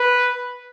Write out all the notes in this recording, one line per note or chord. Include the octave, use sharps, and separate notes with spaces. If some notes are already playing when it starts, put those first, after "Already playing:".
Already playing: B4